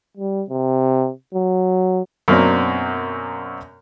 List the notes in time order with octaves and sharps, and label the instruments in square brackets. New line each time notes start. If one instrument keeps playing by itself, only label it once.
[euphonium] G3
C3
F#3
[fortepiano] F#2 B2 F#3 A#3 C4 D4